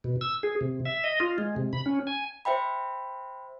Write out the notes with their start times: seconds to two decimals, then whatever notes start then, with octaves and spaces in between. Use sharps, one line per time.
0.04 B2
0.21 E6
0.43 G#4
0.61 C3
0.85 E5
1.04 D#5
1.20 F4
1.38 G#3
1.56 C3
1.73 B5
1.86 C#4
2.07 G#5
2.45 C5 E5 G5 B5